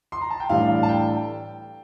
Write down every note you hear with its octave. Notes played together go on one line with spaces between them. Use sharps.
C6
A#5
A5
G5
A2 E3 G3 D4 F5
A5
G5